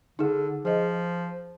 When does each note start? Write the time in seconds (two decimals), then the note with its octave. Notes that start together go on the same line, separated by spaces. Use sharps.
0.19 D3 D#4 G#4
0.65 F3 G#4 D#5